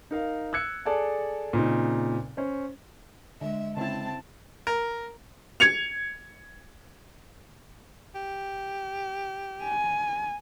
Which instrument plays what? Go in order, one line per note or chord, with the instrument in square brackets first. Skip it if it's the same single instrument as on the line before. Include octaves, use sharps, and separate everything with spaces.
[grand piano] D#4 A#4 F5
E6 F#6 G#6 C#7
G#4 A4 D5 G#5 A5
A#2 C#3 C4 D#4
C#4 C5
[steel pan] D3 [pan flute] G#3 [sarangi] E5
[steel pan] C#3 E4 [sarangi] C4 [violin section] A5
[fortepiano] A#4
[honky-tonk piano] G#6 C#7 F7
[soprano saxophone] G4
[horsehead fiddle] G#5